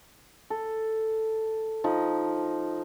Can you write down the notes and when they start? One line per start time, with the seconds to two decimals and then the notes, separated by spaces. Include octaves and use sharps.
0.50 A4
1.84 F3 D#4